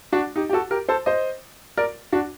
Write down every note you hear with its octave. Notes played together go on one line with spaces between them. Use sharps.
D4 F#4
D#4 G4
G4
F#4 A4
G4 A#4
A4 C5
C5 D#5
A#4 D5
D4 F#4